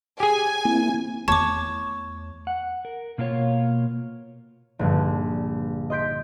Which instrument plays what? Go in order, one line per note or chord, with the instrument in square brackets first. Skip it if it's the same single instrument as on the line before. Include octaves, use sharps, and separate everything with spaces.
[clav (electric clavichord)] G4 G#4 [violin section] G#5
[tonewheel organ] A#3 C4 E4
[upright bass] E2 A3 [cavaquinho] C#5 [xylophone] A5 D6
[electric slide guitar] F#5
A#4
B2 A#3 F4 A4 C#5
[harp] A#1 G2 D3
D#5 C6 G6 B6 D7